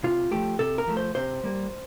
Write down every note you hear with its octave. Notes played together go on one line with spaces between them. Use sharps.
C3 F4
F3 A3 G4
C3 A4
A#4
F3 A3
C5
C3 C5
G3 A#3